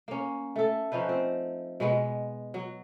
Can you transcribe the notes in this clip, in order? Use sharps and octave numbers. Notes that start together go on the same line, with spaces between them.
A#3 C#4
A3 A4
F3 C#4 D#4 B4
C4
B2 G#3 B3
F#3